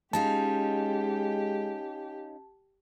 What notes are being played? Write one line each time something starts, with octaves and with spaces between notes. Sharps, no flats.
G#3 C#4 D#4 F4 G4 A5